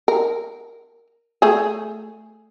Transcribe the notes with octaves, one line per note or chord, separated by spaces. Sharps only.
A#4
A3 G#4